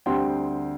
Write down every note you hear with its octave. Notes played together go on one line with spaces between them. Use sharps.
D2 D3 G3 C4 G5 C6